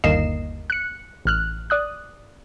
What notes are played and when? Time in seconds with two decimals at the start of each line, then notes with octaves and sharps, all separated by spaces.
0.04 G1 D#2 A#3 D#5 C7 E7
0.70 F#6 C#7
1.25 A1 F6 F#6
1.70 D5 D#6 F#6